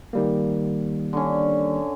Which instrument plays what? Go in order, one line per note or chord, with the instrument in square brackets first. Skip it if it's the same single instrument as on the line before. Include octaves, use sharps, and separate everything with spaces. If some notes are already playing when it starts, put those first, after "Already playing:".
[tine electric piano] D#3 G3 A#3
[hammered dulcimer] D3 C#4